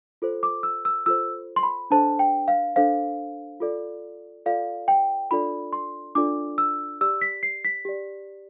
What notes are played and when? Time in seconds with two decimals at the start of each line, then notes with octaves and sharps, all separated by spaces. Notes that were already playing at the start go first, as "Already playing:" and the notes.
0.22 F4 A4 C5
0.43 D6
0.63 E6
0.85 E6
1.06 F4 A4 C5 E6
1.56 C6
1.63 B5
1.91 D4 A4 C5 A5
2.19 G5
2.48 F5
2.76 D4 A4 C5 F5
3.60 F4 A4 D5
4.46 F4 A4 D5 F5
4.88 G5
5.31 D4 F4 A4 D5 B5
5.73 C6
6.15 D4 F4 A4 D5 D6
6.58 E6
7.01 G4 D5 E6
7.21 B6
7.43 C7
7.65 B6
7.85 G4 D5